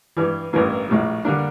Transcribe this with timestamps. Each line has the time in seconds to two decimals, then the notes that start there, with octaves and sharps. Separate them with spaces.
0.17 G2 E3 G3
0.53 A1 G2 E3 A#3
0.88 A#1 A2 G3
1.25 D3 G3 A#3 D4